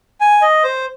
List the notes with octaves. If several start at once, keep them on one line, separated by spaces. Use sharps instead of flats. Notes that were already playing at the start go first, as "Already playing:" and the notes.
G#5
D#5
C5